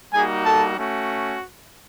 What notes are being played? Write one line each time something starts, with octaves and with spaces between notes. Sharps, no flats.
G3 A#3 D#4 F#4 G#4 G#5
A4 A5
A3 C#4 F#4